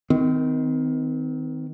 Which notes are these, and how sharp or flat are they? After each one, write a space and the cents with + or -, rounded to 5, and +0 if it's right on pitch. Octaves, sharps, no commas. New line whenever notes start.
D#3 +15 C4 -35